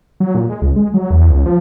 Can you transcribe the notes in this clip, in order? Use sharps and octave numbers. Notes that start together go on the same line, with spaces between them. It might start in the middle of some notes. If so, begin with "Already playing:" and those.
F#3
A#2
G#3
C#2
G#3
F#3
E2
C#2
F3